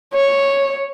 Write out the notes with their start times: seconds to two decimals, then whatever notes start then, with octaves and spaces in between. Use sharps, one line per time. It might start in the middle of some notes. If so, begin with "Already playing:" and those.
0.14 C#5